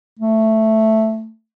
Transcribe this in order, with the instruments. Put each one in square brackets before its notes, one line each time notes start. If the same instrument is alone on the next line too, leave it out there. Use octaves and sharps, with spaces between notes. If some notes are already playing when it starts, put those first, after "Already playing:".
[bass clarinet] A3